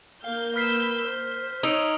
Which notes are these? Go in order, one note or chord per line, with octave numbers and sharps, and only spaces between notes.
A#3 F5 G6
B4 E6 F6 B6 C7
C5
D#4 C#5 D#6 E6 D7